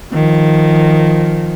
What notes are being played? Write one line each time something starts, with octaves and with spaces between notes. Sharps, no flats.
D#3 F3